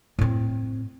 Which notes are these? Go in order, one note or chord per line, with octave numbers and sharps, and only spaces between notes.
A2 C4